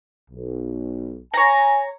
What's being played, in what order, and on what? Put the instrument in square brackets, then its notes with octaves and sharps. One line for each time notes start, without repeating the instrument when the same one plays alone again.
[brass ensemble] B1
[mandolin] C#5 A#5 [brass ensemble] G#5